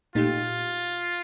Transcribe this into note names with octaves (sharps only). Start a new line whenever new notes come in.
A#2 A3 D#4 F4 G4